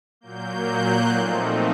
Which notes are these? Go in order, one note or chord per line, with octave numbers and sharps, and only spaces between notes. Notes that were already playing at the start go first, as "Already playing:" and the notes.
A#2 F#3 A#3 G6
F#6
A#2 F3 A3 C4 D#4